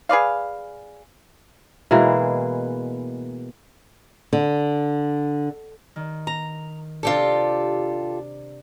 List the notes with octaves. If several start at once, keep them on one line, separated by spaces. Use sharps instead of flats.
G#4 B4 D5 F5
B2 E3 G#3 A#3
D3
D#3
A#5
C3 D4 F4 G4 A4